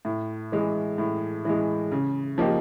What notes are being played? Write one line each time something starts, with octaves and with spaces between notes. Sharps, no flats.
A2
E3 G#3
A2
E3 G#3
C#3
F3 A#3 D#4 G4